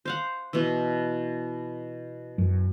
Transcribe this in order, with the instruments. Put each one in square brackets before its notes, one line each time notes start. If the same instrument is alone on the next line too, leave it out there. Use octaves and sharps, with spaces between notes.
[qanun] C5 F5 F#5
B2 E3
[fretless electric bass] F#2